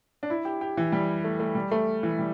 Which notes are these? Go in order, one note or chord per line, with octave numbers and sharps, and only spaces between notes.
D4
E4
G4
G4
E3
G3
A3
A3
G3
A3
E3
G3